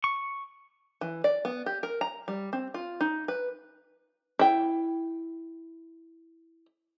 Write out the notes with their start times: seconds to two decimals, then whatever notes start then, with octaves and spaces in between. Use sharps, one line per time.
0.04 C#6
1.01 E3
1.24 D5
1.45 B3
1.66 G4
1.83 A#4
2.01 A#5
2.28 G3
2.53 C4
2.74 F4
3.01 D#4
3.28 B4
4.39 E4 G5